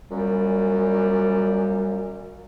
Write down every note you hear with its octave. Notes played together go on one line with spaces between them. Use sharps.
F#2 A#2 G3